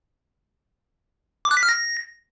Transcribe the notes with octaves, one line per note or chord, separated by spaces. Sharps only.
D6
F#6
B6
F6
A#6